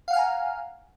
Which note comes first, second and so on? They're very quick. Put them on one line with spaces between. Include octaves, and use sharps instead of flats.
F5 F#5 F6 G#5 A#5